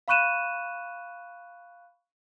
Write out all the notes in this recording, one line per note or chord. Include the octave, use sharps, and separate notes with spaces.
F5 B5 C#6 F#6 D#7 E7